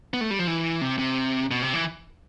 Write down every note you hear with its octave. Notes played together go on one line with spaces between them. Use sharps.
B3
A3
G3
F3
E3
C3
C3
B2
C3
E3